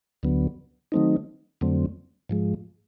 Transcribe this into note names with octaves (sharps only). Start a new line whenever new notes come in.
D2 D3 F#3 B3
D#3 F#3 A3 C4 D#4
F2 D3 F#3 A3 C4
G#2 F3 G#3